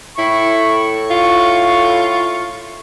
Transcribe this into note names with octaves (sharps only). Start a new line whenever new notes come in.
A2 E4 C#6
F4